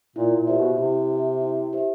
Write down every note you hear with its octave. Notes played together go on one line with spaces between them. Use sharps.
A#2 E4
A#2
G4 C5 E5
B2
B2
C3 E4
G4 C5 E5
E4
G4 C5 E5